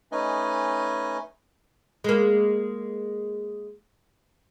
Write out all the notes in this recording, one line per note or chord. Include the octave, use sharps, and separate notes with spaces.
A3 C#4 D#4 B4 D#5 G#5
G#3 A#3